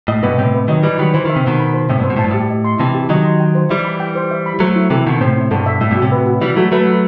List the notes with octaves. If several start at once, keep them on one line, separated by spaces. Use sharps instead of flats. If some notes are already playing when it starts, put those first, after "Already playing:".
A2 D#5
G2 B2 B4
A2 C3 G5
B4
D#3 F#3 D#5
E3 G3 B4
D#3 F#3 B5
E3 C5
D#3 E5
C3
B2 D#3 C5
B5
C5
A2 C3 E5
G2 B2
C5
B2
A2 A5
G2
A2 G4
D#5
C6
C3 E3 A5
G4
D#3 F#3 D#5
C6
G5
C5
E3 G3 E5
B5
G5
C5
E5
B5
F#3 A3 C5
E4
C3 E3 A4
B2 D#3 E5
A2 C3 C5
E4
G2 B2 A4
E5
A2 E5
G2 B2
F#4
A2 C3
B4
F#4
E3 G3 E5
F#3 A3 F#4
F#3 A3 B4
F#4